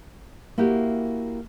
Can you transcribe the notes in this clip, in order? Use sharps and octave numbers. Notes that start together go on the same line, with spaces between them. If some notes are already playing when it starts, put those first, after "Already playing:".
A#3 E4 F#4 G4